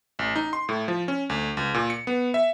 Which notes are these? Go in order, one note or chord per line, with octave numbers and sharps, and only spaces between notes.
A1
D#4
C6
A2
F3
C#4
D2
C#2
A#2
C#7
B3
E5